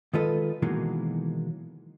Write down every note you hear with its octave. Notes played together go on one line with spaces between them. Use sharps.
D#3 G#3 F4 A4 B4 D#5
B2 D#3 E3 F#3 G#3 A#3